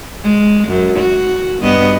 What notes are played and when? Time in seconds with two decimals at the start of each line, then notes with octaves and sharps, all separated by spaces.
0.23 G#3
0.68 F#2
0.99 F#4
1.61 G2 B3 D#5